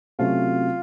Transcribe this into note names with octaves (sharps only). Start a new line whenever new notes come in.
C3 F#3 A3 C#4 F4